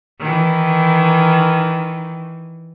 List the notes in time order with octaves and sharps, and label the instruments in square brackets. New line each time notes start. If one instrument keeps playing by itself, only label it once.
[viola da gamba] D#3 E3